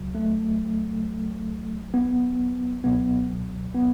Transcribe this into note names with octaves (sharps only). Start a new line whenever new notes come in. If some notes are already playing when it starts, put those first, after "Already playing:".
Already playing: C#2 C#3 F#3
A3
B3
C#2 B2 F#3 B3
B3